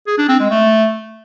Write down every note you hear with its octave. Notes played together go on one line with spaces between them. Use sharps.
G#4
D4
C4
G#3
A3